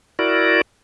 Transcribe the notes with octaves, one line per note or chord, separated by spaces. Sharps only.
E4 F#4 A#4 D5